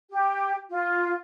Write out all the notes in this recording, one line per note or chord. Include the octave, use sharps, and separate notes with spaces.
G4
F4